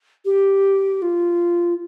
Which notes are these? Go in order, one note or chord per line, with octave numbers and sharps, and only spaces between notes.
G4
F4